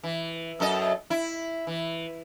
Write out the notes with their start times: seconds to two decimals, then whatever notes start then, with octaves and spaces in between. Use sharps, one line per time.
0.04 E3
0.60 F#2 A4 D#5
1.10 E4
1.67 E3